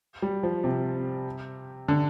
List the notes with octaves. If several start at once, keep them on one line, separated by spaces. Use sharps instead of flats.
G3
F3
C3
D3